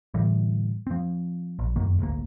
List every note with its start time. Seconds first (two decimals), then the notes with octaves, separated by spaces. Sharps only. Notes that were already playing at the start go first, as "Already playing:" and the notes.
0.14 A2 D3 E3 G3
0.87 F3 C4
1.59 A#1
1.76 F1 F#2 D#3 A#3
1.99 D#1 G#1 D2 A#3